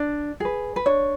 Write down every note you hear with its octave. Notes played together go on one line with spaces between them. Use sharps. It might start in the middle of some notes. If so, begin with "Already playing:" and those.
Already playing: D4
G#4 B4
B4
D4 C#5